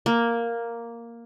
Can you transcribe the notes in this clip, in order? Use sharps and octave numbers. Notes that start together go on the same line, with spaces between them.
A#3